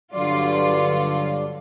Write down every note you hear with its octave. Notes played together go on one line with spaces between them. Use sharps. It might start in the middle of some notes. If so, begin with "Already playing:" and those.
G2 D3 F#3 F4 D5